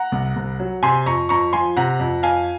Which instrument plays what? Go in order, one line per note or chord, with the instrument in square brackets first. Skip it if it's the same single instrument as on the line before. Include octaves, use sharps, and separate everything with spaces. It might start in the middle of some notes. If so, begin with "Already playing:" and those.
Already playing: [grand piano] F#5 A#5
C2
C2
F#3
C3 G#5 C6
F2 A#5 C#6
F2 A#5 C#6
F3 G#5 C6
C3 F#5 A#5
F2
F2 F5 G#5